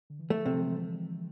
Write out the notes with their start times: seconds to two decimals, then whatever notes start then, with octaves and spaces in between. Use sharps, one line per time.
0.10 D3
0.19 E3
0.30 D3 F3 A3
0.46 C3
0.53 F3
0.62 E3 G#3